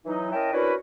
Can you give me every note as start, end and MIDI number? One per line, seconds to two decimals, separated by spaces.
0.05 0.30 52
0.05 0.30 54
0.05 0.30 63
0.32 0.51 61
0.32 0.51 64
0.32 0.51 70
0.32 0.51 75
0.32 0.51 79
0.32 0.51 81
0.52 0.73 61
0.52 0.73 62
0.52 0.73 64
0.52 0.73 66
0.52 0.73 70
0.52 0.73 71